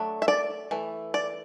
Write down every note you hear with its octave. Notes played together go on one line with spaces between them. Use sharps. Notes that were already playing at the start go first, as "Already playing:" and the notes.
Already playing: F#3 A3 D4
E5
D5
E3 A3
D5